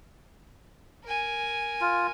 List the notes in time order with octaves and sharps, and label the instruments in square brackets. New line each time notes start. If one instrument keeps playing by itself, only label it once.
[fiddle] A#4 G#5
[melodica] F4